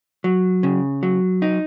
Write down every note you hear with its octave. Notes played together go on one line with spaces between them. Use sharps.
F#3
C#3
F#3
D#4